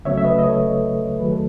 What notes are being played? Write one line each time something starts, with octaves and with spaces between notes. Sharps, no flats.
C#2 C#3 F#3 A3 C#5 E5
E5
B4 D#5
D#5
A4 C#5
D#2 D#3 F#3 A3 G#4 B4
A4